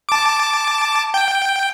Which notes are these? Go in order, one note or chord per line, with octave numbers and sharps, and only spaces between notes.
A5 D6
G5